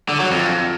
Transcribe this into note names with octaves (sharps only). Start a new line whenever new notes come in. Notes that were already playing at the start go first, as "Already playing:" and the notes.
D3
F#3
F2